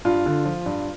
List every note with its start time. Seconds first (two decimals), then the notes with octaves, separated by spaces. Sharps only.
0.05 G2 F4
0.26 D3
0.45 F3
0.66 G2